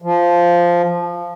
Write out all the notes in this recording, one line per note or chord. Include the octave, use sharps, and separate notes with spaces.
F3